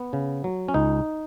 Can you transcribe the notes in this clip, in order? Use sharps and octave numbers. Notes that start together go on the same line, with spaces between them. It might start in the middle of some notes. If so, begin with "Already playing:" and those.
Already playing: B3
C#3
F#3
C#4
C#2 D#4